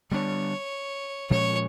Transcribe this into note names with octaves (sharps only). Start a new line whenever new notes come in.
D3 G3 B3 D4 C#5
A#2 F3 G#3 C#4 C#5